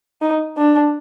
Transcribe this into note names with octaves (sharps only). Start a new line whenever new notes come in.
D#4
D4